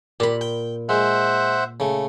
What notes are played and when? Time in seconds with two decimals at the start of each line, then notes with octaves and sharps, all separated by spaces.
0.20 A#2 G4 B5
0.41 G5
0.89 G#3 C5 E5 F#5
1.80 C#3 A3